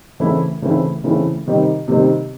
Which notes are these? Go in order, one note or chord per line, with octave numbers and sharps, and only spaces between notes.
C#3 E3 A3 C4 E4
C#3 E3 A3 C4 E4
C#3 E3 A3 C4 E4
C3 D#3 G3 C4
C3 D#3 G3 C4